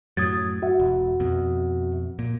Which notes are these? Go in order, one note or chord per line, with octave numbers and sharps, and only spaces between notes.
F#2 A2 F#3 D#6 G#6 A6
F#4 E5 F#5
E1
F2 B2
A#2